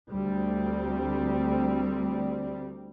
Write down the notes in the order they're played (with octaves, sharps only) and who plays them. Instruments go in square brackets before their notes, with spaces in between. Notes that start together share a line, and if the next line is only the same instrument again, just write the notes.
[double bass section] D2 G3 C4